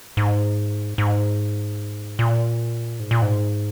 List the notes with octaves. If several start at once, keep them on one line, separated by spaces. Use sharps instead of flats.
G#2
G#2
A#2
G#2
A#2
G#2